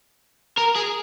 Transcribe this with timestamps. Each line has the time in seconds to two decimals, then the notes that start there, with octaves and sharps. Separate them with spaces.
0.57 A#4
0.75 G#4